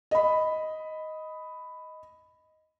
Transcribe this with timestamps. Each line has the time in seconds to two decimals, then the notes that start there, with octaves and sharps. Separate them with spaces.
0.11 D#5 B5